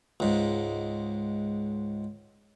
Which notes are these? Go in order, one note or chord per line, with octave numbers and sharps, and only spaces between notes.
C#2 G#2